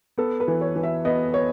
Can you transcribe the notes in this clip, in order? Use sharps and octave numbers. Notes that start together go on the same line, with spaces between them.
B3 A4
B4
E3
C#5
E3
E5
B3 D#5
B3 C#5